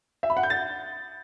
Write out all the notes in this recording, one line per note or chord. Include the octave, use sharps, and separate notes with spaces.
E5
B5
F#5
G6
A6